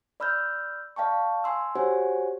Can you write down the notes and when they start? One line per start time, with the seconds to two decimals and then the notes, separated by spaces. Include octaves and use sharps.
0.20 D5 B5 E6 F6 G6
0.96 D5 F5 G5 A5 C#6
1.44 G#5 C6 E6
1.75 F#4 G4 C5 C#5 F#5 G#5